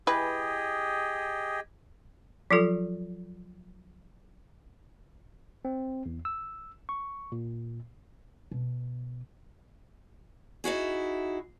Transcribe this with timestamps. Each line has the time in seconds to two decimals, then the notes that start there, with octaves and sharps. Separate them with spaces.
0.07 E3 G4 G#4 B4 D#5 B5
2.51 F3 F#3 F4 A4
5.65 C4
6.06 E2
6.25 E6
6.89 C#6
7.32 A#2
8.51 B2
10.64 D#4 E4 F#4 G#4